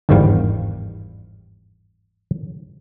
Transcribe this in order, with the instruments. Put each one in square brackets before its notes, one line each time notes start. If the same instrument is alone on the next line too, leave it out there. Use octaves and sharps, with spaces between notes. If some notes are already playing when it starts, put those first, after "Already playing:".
[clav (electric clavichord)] G1 E2 G#2 D#3 G3 F5